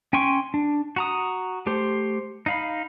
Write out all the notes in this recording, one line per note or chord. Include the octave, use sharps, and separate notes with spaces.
C#4 G5 G#5 C6 C#6
D4
F#4 A#5 D#6
A3 G4 C5
D#4 F5 B5